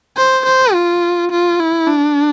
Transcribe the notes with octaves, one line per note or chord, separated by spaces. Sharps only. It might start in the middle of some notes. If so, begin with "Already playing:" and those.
C5
C5
F4
F4
E4
D4